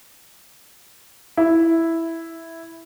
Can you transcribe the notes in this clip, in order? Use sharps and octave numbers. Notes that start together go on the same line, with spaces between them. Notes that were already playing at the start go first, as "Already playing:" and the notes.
E4